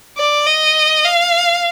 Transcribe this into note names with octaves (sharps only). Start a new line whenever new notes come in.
D5
D#5
F5